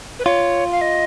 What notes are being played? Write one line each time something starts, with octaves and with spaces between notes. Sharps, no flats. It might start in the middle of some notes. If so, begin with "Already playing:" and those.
B4
F4 C#5
F5
D#5